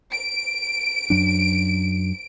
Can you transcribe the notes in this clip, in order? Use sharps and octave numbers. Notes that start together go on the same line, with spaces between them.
D7
F#2 F#3 D4